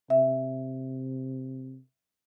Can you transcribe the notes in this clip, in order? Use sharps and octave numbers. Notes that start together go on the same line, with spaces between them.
C3 E5